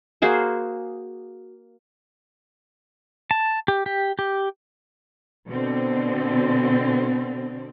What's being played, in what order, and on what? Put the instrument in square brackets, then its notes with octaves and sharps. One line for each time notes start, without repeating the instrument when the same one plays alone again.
[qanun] A#3 F#4 G#4 C5
[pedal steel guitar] A5
G4
G4
G4
[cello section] B2 D3 C4